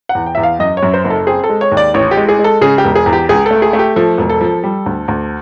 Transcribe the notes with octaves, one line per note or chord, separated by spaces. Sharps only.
F#5
E2
G5
E2 E5
F5
F#2 D#5
C#5
F#2
C5
F#1
A4
C4 G#4
A4
G#3
C#5
D#2
D5
A1 C#5
G4
G#3
G#4
G#3
A4
C#3 G#4
G4
E1
G#4
E2
G4
C#2 G#4
A3 A4
G#4
A3
G4
F3 A4
E1
A4
F3
G3
D2
D2